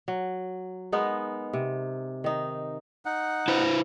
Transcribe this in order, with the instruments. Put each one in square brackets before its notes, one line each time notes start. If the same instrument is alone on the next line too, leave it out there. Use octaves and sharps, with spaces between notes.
[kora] F#3
G#3 B3 D#4 A#4
C3
D#3 D#4
[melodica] D#4 F#5
[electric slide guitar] E4 B4 C5